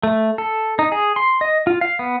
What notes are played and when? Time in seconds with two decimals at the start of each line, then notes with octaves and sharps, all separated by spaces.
0.03 A3
0.38 A4
0.79 D#4
0.92 G#4
1.16 C6
1.41 D#5
1.67 F4
1.81 F5
1.99 B3